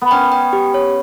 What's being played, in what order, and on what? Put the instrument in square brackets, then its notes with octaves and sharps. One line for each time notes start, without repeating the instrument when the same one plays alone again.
[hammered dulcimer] B3
[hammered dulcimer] C#4 [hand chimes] G5
[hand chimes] G5
G4
C#5